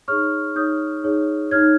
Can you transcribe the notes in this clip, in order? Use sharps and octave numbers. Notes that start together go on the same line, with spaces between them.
D#4 G#4 C#5 C#6 F6
D#4 G#4 C#5 D#6 G6
D#4 G#4 C#5
D#4 G#4 C#5 F6 G#6